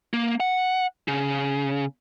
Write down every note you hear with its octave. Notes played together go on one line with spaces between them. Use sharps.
A#3
F#5
C#3